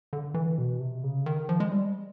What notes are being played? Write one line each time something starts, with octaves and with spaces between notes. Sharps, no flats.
D3
E3
B2
C3
C#3
D#3
F3
G#3
G3